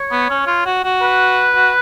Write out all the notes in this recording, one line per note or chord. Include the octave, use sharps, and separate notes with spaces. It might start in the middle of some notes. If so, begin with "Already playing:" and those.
Already playing: C#5
B3
C#4
F4
F#4
F#4
B4
F#4